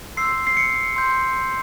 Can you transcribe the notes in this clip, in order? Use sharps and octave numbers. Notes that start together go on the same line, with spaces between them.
C6 E6 G6 C7
C7
C#7
C6 G6